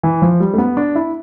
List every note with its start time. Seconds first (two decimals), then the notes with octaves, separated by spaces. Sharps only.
0.03 E3
0.22 F3
0.40 G3
0.54 A3
0.58 B3
0.77 D4
0.95 E4